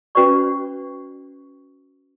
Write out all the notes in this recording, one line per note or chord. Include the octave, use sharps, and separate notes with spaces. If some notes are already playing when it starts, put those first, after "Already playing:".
C#4 F#4 B4 C5 D5 C#6